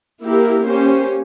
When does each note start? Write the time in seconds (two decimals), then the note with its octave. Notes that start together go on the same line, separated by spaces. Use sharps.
0.23 A#3 E4 G4 A#4
0.64 A#3 C#4 G4 C5